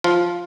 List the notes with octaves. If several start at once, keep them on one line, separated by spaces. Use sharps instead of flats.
F3 F4